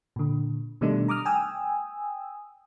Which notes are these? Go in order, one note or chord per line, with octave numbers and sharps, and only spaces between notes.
A#2 D3
B2 D#3 G3 A3 D4 D#4
A#5 D6 D#6 F6
G5 G#5 D#6 E6